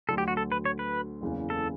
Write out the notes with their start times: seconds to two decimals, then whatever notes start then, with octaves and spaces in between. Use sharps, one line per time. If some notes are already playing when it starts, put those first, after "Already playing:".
0.09 D2 D3 F#3 A4
0.18 G4
0.28 F#4
0.37 A4
0.52 B4
0.65 C#5
0.79 B4
1.21 F#1 E2 C#3
1.50 A4